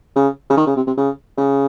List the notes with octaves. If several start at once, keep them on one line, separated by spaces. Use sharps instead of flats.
C#3
C#3
D#3
C#3
C3
C3
C#3
C#3